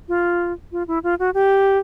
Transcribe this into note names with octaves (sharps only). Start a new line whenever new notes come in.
F4
F4
E4
F4
F#4
G4